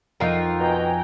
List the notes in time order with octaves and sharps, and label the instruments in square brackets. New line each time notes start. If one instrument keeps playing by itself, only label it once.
[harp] F2 [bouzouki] D#4 F4 A#4
[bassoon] B2 [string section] G5 G#5 A#5